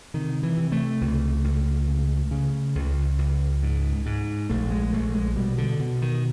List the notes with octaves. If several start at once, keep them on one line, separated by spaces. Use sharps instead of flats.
C3 D#3
E3
C3
A3
C#2
C#2
C#3
C#3
C#2
C#2
G#2
G#2
A#1 A3
G#3
A#1 A3
G#3
B2 G3
D3
B2
D#3